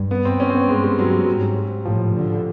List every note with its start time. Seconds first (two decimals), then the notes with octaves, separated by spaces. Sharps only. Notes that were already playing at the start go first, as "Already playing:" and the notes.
Already playing: G2
0.11 B3
0.25 C4
0.40 C#4
0.50 C4
0.55 B3
0.69 G2 G#3
0.83 G3
0.99 F#3
1.13 G3
1.28 G#2
1.85 A2 F3
2.15 D3